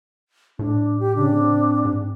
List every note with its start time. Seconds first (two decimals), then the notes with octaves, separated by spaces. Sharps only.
0.59 A2 D4
1.00 G4
1.16 C#3 D4
1.33 C4
1.85 G#2